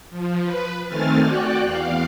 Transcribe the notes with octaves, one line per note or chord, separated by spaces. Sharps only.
F3
B4
D#3 A3 C4 G#5 F6 A6
F#4 D5 G5 F#6
E2 F5